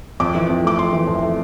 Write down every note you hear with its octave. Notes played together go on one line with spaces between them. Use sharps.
F2 D6
E3
F2
A3 D6
F2 C6
E3
F2
A3